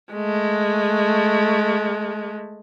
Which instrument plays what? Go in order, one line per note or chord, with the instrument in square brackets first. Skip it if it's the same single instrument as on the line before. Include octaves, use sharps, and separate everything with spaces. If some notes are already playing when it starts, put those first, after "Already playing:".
[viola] G#3 A3